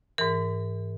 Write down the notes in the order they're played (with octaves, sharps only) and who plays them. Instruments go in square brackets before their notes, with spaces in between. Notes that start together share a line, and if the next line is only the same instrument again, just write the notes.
[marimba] G#2 E3 A#4